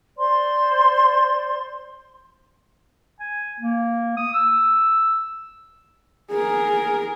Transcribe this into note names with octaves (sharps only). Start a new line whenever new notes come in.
C5 D5 C6
G#5
A#3
D#6
E6
G#4 A#4